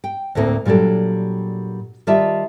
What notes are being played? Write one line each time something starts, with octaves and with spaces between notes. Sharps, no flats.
G5
D2 A2 A3 A#3 C4
A#2 F#3 G3 D4 A4
D#3 G3 F4 D5 E5 A5